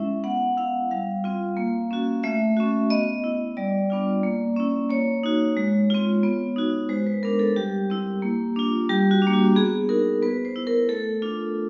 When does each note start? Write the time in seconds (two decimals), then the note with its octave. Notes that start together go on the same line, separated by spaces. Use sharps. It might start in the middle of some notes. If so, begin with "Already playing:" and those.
Already playing: G#3 C#4 E4 E5
0.24 B3 F#5
0.57 E4 F5
0.91 G3 F5
1.24 C4 F4
1.57 A#3
1.91 C#4 F#4
2.23 A3 E5
2.57 C#4 F#4
2.90 B3 D#5
3.24 E4
3.57 G3 D5
3.90 B3 D4 F4
4.23 A#3
4.57 C#4 E4
4.90 A#3 C#5
5.23 D#4 F#4
5.57 G#3
5.90 C4 F4
6.23 B3
6.56 D#4 F#4
6.89 G#3 C5
7.06 B4
7.23 B3 D4 A#4
7.39 A4
7.56 G3 G4
7.90 C4 E4
8.22 A#3
8.56 D4 F4
8.89 G3 G4
9.11 F#4
9.22 A#3 D4
9.33 F#4
9.56 B3 G#4
9.89 D#4 F#4 A#4
10.22 B3 B4
10.45 C5
10.56 E4
10.67 A#4
10.89 A3 A4
11.22 D4 F4